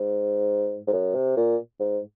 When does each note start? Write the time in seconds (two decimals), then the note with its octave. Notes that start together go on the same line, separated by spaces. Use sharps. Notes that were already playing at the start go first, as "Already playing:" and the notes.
Already playing: G#2
0.87 G#2
0.93 F#2
1.14 C3
1.37 A#2
1.79 G#2